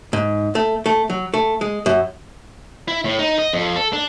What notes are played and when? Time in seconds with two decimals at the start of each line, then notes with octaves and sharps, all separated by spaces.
0.13 G#2
0.55 A3
0.86 A3
1.10 F#3
1.34 A3
1.61 G#3
1.86 F#2
2.88 E4
3.05 A2
3.19 D#4
3.39 D#5
3.53 F2
3.76 A4
3.93 D4